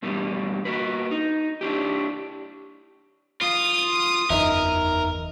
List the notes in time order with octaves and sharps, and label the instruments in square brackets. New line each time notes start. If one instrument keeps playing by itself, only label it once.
[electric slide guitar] G2 B2 E3 G3
A#3 F#4 B4
D#4
D4 E4 G4
[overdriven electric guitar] F4 [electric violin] D#6
[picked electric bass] F#1 E2 [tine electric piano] D#4 D#5 E5 [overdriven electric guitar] A#4